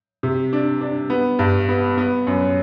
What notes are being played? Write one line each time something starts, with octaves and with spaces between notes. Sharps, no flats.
C3
D4
D4
B3
G2
B3
B3
F#2